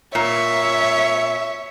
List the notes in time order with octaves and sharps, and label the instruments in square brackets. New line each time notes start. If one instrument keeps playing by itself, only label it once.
[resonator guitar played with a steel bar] A#2 [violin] C#5 [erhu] E5